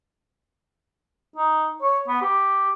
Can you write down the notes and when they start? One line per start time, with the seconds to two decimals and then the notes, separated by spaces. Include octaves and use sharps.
1.36 D#4
1.82 C#5
2.08 B3
2.22 G4